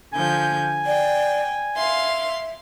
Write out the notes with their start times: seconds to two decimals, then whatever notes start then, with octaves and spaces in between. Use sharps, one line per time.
0.13 D3 F3 G#5 G6
0.86 D5 G5
1.76 E5 F5 C6